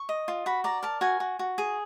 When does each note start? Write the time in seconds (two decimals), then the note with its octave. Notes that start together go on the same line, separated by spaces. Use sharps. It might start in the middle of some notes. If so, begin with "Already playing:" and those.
Already playing: C#6
0.09 D#5
0.28 F4
0.46 F#4 B5
0.64 D5 A#5
0.83 A#4 A5
1.01 F#4 G#5
1.20 F#4
1.39 F#4
1.58 G#4